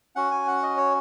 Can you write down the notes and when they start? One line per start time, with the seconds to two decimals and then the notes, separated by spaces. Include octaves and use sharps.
0.16 C#4 F#4 F#5
0.31 G#5
0.48 F#5
0.63 D#5
0.77 C#5